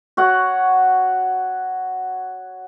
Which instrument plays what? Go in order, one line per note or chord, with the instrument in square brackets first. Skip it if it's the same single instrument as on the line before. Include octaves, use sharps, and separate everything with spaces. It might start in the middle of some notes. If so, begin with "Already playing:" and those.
[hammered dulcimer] F#4 C#5 F#5